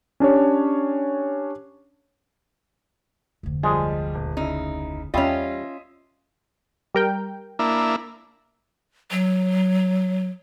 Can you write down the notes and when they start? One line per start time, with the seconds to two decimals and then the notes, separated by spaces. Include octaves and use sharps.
0.20 C#4 D4 G4 C#5
3.43 F1 D2
3.63 F3 G3 G#3 G#4
4.15 D#1
4.37 C#3 D#4 E4
5.14 E2 G3 C#4 F4 D#5 E5
6.95 G3 A#4 G5
7.59 A#3 D4 E4
9.11 F#3